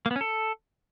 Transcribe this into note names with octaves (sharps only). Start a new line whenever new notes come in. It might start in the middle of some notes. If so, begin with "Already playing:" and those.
A#3
B3
C#4
A4